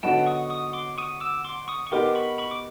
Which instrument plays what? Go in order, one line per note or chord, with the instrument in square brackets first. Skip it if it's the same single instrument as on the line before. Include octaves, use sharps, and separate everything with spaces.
[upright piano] D3 F#3 B3 D#4 F#4 [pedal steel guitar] G5 A5
[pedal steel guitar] C#6 D#6
C#6 D#6
C6 D6
C#6 D#6
D6 E6
C6 D6
C#6 D#6
C#6
[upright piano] B3 D#4 G4 A#4 [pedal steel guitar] C6 D6
[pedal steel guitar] B5 C#6
B5 C#6
D6